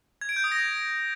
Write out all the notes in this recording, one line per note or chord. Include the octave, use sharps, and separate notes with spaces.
G#6
D7
G6
D#6
A#6